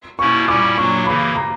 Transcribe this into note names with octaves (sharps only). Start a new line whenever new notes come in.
B2 A#3 C#4 E4 C#6
A#2 G3 C#4 E4 D6
A#2 F#3 A#3 D4 C#6
C#3 E3 A#3 B5
A#5